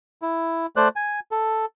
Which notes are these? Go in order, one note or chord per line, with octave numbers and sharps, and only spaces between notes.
E4
A3 C5 D5 F#6
G#5
A4